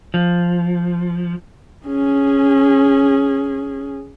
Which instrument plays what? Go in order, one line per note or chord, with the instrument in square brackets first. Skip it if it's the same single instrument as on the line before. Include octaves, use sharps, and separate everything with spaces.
[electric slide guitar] F3
[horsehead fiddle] C#4 G#4